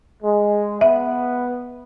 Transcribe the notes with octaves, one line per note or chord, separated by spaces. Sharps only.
G#3
B3 E5